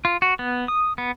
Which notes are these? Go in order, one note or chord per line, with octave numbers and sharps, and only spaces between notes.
F4
F#4
B3
D#6
B3